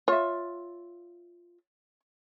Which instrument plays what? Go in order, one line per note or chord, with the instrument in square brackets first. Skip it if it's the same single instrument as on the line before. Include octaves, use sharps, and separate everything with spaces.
[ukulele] F4 E5 [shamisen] C#5